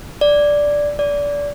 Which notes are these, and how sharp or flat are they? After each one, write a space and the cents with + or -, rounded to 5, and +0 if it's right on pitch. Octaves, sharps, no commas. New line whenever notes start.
D5 -5
D5 -25